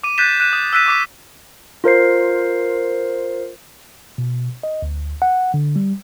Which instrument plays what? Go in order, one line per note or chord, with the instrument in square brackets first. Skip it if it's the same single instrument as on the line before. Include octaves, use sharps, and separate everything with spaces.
[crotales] D6 D#7
F#6 G6 A6 B6 E7
F#6 D#7 E7
D#6
E6 F#6 B6 D#7 E7
C#6 D6 B6
[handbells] F4 A#4 C5 C7
[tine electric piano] B2
D#5
D2
F#5
D3
G3